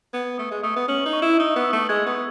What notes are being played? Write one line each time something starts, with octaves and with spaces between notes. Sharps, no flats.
B3 G#6
A3 D#6
G#3
A3 D#6
B3
C#4 F#7
D#4
C#6
E4
D#4 E6
B3
E6
A3
G#3 G#6
B3
G#6